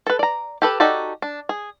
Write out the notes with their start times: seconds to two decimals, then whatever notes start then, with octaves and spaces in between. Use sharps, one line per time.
0.07 A4 B4
0.19 D5 A#5
0.62 G4 A4 B4
0.80 D#4 F#4 G4 A4 D5
1.22 D4
1.49 G#4